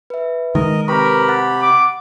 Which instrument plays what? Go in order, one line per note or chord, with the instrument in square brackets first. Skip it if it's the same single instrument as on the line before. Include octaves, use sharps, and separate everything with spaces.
[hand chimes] B4 E5
[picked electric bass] D#3 G#3 [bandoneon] A#4 D#5
[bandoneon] C3 G4 B5 [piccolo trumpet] A#4 [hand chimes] B4 A#5 C#6
[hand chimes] F#5 F#6 A6
[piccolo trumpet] D6